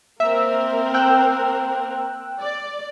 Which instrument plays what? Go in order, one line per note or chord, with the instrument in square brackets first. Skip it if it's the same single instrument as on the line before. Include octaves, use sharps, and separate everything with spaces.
[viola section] A#3 C4 A#4 [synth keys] E5
[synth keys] G5 E6 F#6
[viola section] D5